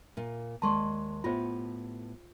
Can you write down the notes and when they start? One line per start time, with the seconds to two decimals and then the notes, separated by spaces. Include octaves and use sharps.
0.17 A#2 F4
0.62 D#2 G#3 D5 A5 C6 C#6
1.24 A2 B3 F4 G4 C5